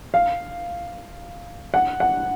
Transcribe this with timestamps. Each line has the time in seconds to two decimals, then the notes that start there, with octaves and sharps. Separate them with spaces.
0.14 F5
1.74 F#5
2.00 F#5